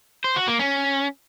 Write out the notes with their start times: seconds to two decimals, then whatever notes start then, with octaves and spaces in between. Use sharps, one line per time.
0.24 C5
0.36 F#4
0.48 A#3
0.59 C#4